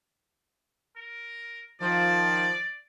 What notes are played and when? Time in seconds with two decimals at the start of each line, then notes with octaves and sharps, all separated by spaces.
0.96 A#4
1.81 D#3 F3 D5